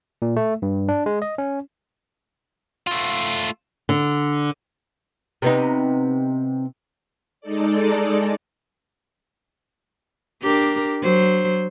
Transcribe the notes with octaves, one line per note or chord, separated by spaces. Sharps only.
A#2
A3
G2
D4
G#3
D#5
C#4
A3 F4
D3
C3 B3 D#4
G#3 D#4 A4 D5
D4 G4 A#4
F#3 C5